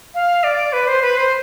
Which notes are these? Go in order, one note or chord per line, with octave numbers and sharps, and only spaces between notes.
F5
D5
B4
C5
B4
C5